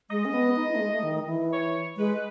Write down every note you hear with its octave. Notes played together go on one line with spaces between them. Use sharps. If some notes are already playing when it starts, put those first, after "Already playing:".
G#3 D#5
C#4
B3
D#4
E4
A3
G#3
A3
D#3
E3
C#5
G#3 B4